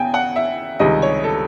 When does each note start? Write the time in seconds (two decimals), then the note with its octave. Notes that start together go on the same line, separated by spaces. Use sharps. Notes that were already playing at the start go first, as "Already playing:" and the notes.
Already playing: E2 C#3 G5 G#5
0.14 F#5
0.36 E5
0.79 C#2 C3 D#3 G3 D#5
1.02 C#5
1.24 A4